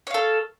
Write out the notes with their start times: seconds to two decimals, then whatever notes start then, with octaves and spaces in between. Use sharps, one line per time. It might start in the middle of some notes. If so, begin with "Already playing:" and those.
0.07 C#5
0.11 F5
0.14 A4